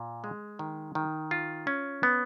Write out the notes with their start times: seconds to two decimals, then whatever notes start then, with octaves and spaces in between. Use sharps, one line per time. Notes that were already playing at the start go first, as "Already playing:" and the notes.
Already playing: A#2
0.24 G#3
0.59 D#3
0.95 D#3
1.31 F4
1.67 C#4
2.03 B3